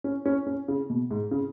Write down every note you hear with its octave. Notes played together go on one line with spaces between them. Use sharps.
C#4
C#4
C#4
C#3
B2
G#2
C#3